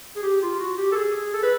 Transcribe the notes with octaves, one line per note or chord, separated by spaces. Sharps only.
G#4
G4
F4
F#4
G4
A4
G#4
A4
B4